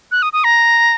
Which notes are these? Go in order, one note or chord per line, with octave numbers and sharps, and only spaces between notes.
F#6
D#6
D#6
A#5